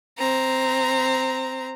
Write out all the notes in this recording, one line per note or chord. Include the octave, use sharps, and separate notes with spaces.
C4 A#5